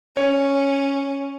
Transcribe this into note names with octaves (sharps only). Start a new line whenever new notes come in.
C#4 C#5